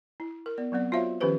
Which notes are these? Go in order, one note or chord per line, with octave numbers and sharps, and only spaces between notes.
E4
A#4
B3 D5
F#3 B3 C4 D5
F4 F#4 C5 C#5 E5 F5
D#3 F3 C#4 G4 B4 C5